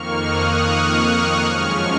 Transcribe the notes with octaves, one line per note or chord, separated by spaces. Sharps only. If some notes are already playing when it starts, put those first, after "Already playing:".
Already playing: F2 D#3 A#3 C#6 F6
D#6 F#6
C#6 F6
F#2 F3 G#3 C#4 C#6 F6